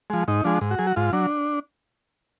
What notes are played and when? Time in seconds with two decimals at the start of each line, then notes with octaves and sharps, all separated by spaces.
0.10 F3 G#3
0.28 G#2 D#4
0.44 F3 G#3 D4
0.61 G#2
0.71 F#4
0.79 F#3 G#4
0.87 F#4
0.96 G#2 F4
1.13 F#3 D4